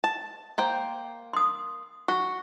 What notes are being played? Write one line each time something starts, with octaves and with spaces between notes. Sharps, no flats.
A5
A#3 C5 G5
C6 D#6
F#4 C#6